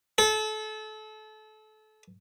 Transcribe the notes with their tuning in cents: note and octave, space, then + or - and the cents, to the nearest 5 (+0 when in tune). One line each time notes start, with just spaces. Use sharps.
A4 -30